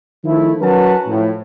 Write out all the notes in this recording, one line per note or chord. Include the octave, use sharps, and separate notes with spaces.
D#3 F3 A3 E4
F#3 C#4 F#4 A#4 B4 A5
A2 F3